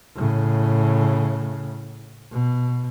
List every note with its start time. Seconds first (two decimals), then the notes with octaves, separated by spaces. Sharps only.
0.16 A2 C#3
2.32 B2